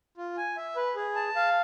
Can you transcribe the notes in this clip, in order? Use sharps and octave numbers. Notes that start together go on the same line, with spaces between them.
F4
G#5
E5
B4
G#4
A5
F5